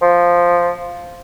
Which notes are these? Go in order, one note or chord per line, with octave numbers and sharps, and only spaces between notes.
F3